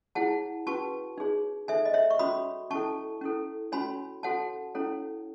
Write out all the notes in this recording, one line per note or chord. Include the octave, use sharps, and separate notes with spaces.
E4 G#4 C#5 F#5 A5
C#4 F#4 B4 A5 C#6
D#4 G#4 C#5
D#4 A4 C#5 E5 G#5
D#5
C#5 E5
C#6
C#4 F#4 C#5 B5 D#6
C#4 E4 A4 A5 C#6
C#4 E4 A4
C#4 F#4 C#5 G#5 B5
F#4 A4 C#5 F#5 A5
C#4 E4 A4 C#5